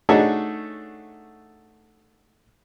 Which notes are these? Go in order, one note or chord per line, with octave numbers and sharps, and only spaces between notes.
A3 D4 D#4 F#4 G#4 C#5